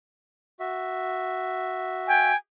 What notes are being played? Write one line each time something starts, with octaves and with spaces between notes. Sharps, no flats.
F#4 E5
G5 G#5